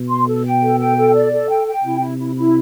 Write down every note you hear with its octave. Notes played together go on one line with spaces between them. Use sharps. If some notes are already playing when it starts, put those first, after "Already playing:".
Already playing: B2
C6
A4
G5
A4
G5
A4
D5
A4
G5
G5
C3 E4
E4
E4
E4